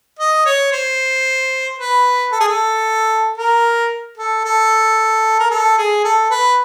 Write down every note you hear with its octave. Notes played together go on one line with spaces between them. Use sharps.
D#5
C#5
C5
B4
A4
G#4
A4
A#4
A4
A4
A#4
A4
G#4
A4
B4